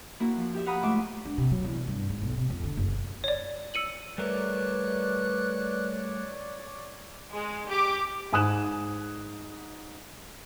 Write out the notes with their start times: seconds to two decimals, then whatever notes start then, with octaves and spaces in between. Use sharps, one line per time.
0.20 A#3 E4 F#4
0.37 F3
0.54 G4 E5
0.66 F5 F#5 A#5 B5 D#6
0.82 G#2 A3 F4 E5 D6
1.25 D4
1.38 C3
1.51 F#3
1.64 E2
1.87 G2
2.09 G#2
2.22 B1
2.37 C3
2.50 F2
2.64 D3
2.77 F#1
3.24 C#5 D5
3.74 E6 C#7 D#7 F#7
4.18 G3 A3 A#4 B4 C#5 D5 F#6
7.32 G#3
7.69 G4 D6
8.33 G#2 G#5 D#6 F#6 E7